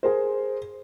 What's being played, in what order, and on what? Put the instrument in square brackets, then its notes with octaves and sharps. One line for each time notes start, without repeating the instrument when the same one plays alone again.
[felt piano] G#4 A#4 C5